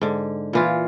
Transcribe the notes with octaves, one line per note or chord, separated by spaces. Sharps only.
G#2 D3
A#2 E3 F4